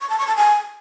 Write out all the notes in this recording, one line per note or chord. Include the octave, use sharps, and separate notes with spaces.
C#6
A5
C#6
A5
G#5